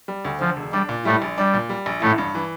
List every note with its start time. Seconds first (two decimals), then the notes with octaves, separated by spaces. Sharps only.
0.08 G3
0.25 D2
0.40 D3 F3
0.57 E1
0.72 G3 D4
0.89 A#2
1.05 A2 G3 A3
1.22 A#1
1.38 G3 D4
1.54 A#2
1.69 G3
1.86 A#1
2.01 A1 A2 A3
2.18 G2
2.35 E3